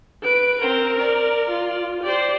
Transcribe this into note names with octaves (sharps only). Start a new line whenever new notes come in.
B4 D7
C4 A#4
D5
F4
G4 C5 D5